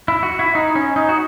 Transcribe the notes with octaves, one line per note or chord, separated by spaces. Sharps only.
E4
F#4
E4
D#4
C#4
D#4
F#4